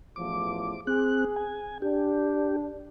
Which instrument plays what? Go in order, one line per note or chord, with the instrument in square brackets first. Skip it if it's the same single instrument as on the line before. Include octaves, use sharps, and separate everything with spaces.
[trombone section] A1 E2 F3 [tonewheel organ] D6
[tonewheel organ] C4 F#6 [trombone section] G#4
[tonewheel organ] G#5
[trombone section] D4 [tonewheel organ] G4